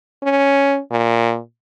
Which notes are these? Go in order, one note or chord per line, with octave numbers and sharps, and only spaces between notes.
C#4
A#2